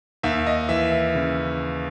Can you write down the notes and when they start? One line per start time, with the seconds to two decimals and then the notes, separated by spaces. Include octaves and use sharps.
0.23 D#2 E5
0.47 D#5
0.69 E3 E5
0.92 E5
1.15 C#3